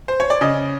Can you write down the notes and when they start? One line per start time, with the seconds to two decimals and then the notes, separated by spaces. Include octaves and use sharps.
0.08 C5
0.20 C#5
0.30 D5
0.41 C#3 D#5